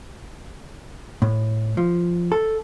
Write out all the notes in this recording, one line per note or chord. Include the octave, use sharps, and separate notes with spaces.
A2
F3
A4